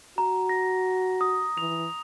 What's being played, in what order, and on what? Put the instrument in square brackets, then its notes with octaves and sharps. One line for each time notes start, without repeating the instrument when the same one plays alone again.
[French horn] F#4 [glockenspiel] A#5
[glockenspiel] A#6
D#6
[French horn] E3 [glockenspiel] F7